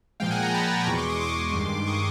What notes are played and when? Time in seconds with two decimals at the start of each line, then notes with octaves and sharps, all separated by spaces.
0.20 A#2 F3 G#3 F5 G5
0.31 F#5 G#5
0.43 G#5 A#5
0.54 A5 B5
0.81 D6
0.86 E2 B2 G#3 B5 C#6
0.97 C6 D6
1.10 C#6 D#6
1.20 C6 D6
1.53 G2 D#3 G#3
1.86 C#6 D#6